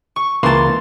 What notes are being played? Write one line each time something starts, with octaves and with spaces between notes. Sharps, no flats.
C#6
C#2 E3 A#3 A5 C6